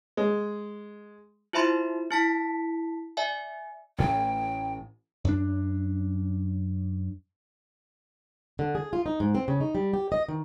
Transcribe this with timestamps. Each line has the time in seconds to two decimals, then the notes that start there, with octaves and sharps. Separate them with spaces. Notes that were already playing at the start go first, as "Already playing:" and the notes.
0.17 G#3
1.53 E4 F4 C5 E5 B5 C6
2.11 E4 A5 B6
3.17 D5 E5 G#5
3.98 A1 A2 C#4 G5
5.25 F#2 D4
8.59 D3
8.75 G#4
8.93 F4
9.06 D#4
9.20 G#2
9.35 C4
9.48 C#3
9.60 D#4
9.75 G3
9.94 G4
10.12 D#5
10.29 D#3